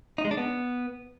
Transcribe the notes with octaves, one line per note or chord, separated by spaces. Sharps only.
D#4
G#3
D4
B3